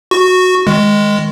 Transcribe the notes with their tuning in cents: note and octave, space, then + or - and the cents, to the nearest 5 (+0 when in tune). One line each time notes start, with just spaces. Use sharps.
F#4 -10 C#6 +0
D#3 +0 G#3 -5